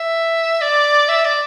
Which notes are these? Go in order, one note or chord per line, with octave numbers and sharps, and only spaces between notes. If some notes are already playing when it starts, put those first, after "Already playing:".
Already playing: E5
D5
E5
D5